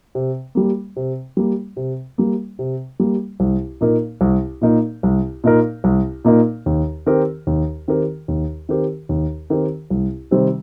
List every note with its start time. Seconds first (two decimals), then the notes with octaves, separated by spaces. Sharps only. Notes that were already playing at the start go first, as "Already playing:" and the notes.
0.15 C3
0.55 G3 A#3
0.96 C3
1.37 G3 A#3
1.77 C3
2.18 G3 A#3
2.59 C3
3.00 G3 A#3
3.40 C2
3.81 A#2 A#3 D#4 A#4
4.21 C2
4.61 A#2 A#3 D#4 A#4
5.03 C2
5.44 A#2 A#3 D#4 A#4
5.84 C2
6.25 A#2 A#3 D#4 A#4
6.66 D#2
7.06 D#3 C4 G4 A#4
7.47 D#2
7.88 D#3 C4 G4 A#4
8.28 D#2
8.69 D#3 C4 G4 A#4
9.09 D#2
9.50 D#3 C4 G4 A#4
9.90 C2
10.31 C3 D#3 G3 C4